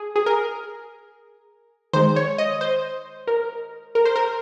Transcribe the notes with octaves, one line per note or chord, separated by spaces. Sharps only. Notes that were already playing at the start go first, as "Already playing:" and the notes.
Already playing: G#4
G#4
A#4
D#3 G#3 C5
C#5
D#5
C5
A#4
A#4
C5
A#4